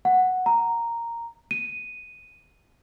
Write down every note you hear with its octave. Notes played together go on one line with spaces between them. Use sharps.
F#5
A#5
D#7